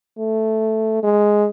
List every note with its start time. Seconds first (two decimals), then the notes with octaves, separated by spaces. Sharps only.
0.18 A3
1.03 G#3